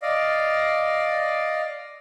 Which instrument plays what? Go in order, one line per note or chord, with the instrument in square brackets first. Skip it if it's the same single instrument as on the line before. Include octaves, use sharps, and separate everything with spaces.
[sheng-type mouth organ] D5 D#5 F5